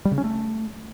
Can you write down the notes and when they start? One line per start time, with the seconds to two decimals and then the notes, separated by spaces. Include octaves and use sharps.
0.05 G3
0.12 C#3
0.18 C#4
0.24 A3